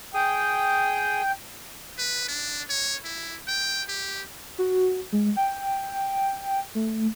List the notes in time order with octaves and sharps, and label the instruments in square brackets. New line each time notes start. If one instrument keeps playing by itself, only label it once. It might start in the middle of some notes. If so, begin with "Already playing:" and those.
[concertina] G#4 D#6 [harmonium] G5
[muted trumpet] B4
D4
C#5
E4
G5
G4
[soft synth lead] F#4
G#3
G5
A3